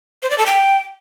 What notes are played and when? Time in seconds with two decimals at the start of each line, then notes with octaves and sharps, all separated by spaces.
0.23 C5
0.30 D5
0.38 A4
0.46 G5